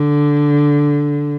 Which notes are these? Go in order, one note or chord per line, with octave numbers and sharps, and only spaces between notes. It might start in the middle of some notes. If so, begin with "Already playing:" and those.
Already playing: D3